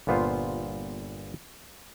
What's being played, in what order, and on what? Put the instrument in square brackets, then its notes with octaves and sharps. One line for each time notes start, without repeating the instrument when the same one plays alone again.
[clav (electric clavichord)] G1 A#2 B3 F4 C5